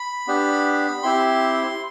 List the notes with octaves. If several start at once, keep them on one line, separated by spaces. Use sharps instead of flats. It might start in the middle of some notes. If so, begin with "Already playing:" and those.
Already playing: B5
B3 D4 G4
C4 E4 G4 C6